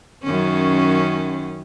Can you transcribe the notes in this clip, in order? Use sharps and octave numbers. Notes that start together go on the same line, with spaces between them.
F#2 D#3 C#4